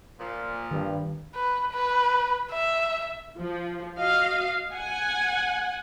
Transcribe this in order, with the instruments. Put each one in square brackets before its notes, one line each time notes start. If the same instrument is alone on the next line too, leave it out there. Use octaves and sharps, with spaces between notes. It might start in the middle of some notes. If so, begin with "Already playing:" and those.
[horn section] A#2 F3
[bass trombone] G2 [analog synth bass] D#3
[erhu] B4
B4
E5
[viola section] F3
F#4 D#5 F5
F#5 G#5